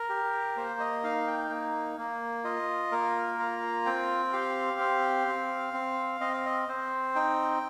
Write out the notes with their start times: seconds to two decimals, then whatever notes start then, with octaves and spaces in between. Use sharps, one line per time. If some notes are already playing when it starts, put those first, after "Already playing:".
Already playing: A#4
0.09 G4
0.57 A#3 C5
0.80 D#5
1.04 D#4 F5
1.27 G5
1.50 A#3
1.98 A#3
2.44 F4 D#5
2.92 A#3 A#4
3.39 F4 A#5
3.86 C4 G5
4.33 G4 F5
4.80 C4
5.27 C4
5.73 C4
6.20 C4 D#5
6.33 F5
6.45 D#5
6.69 C4 C5
7.15 D#4 G5